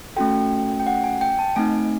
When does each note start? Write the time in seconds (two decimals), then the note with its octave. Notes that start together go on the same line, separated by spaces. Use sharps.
0.16 A3 C#4 F#4 A4 G5
0.80 G5
0.87 F#5
1.04 G#5
1.21 G5
1.39 A5
1.56 A3 C4 D#4 G#5